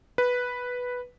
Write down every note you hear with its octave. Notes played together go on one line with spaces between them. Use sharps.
B4